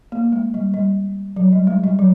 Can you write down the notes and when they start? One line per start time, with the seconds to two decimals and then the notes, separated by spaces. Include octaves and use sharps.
0.12 A#3
0.32 G#3
0.54 G3
0.74 G3
1.36 F#3
1.52 G3
1.67 G#3
1.84 G3
1.99 F#3